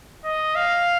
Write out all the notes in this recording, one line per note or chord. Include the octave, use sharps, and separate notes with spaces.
D#5
F5